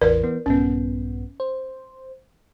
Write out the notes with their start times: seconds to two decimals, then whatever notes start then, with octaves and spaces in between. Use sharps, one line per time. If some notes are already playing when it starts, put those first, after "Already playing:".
0.01 A1 E2 E3 A#4 B4 D5
0.23 E3 B3
0.46 A#1 G2 B3 C#4
1.40 C5